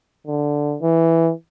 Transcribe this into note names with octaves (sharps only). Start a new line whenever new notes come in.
D3
E3